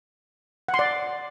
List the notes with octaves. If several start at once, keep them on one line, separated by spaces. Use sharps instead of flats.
F#5
C6
D5